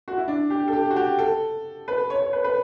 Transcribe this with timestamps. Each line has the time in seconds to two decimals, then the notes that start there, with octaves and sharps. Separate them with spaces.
0.08 F#4
0.18 E4
0.28 D4
0.50 G4
0.68 A4
0.73 G4
0.90 F#4
0.96 G4
1.19 A4
1.88 B4
2.10 C#5
2.22 C#5
2.33 B4
2.44 B4